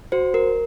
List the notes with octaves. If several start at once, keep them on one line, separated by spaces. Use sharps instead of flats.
F#4 C5
A#4